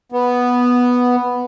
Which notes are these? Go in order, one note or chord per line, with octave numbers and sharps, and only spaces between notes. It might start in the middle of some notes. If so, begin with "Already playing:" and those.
B3